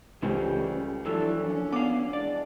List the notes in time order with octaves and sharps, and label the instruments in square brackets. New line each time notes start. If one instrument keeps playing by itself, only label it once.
[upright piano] C#2 [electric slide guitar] E3 C#4 C5 [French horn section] G3 A3 G4
[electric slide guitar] F2 E3 F#3 [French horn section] D4 E4 A4 [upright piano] E6
[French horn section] A#2 C#4 D4
[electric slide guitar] B3 F5 [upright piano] D6
[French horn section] E3 G#3 D4 [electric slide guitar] D5